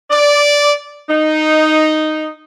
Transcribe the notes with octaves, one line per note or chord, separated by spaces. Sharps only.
D5
D#4